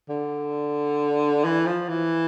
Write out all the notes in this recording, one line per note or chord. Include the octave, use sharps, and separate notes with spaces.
D3
E3
F3
E3